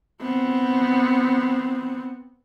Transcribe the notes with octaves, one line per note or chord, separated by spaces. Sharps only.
B3 C4